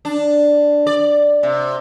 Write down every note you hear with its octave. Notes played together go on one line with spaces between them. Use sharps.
D4
D5
C3